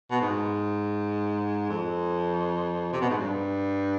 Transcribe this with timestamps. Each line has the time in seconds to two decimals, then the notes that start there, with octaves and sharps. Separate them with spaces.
0.11 B2
0.21 G#2
1.69 F2
2.93 C3
3.01 B2
3.10 G#2
3.18 G2